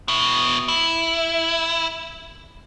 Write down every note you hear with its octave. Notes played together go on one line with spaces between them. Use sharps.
B2 E4
E4